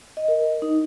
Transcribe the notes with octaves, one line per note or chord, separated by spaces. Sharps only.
D#5
A#4
D#4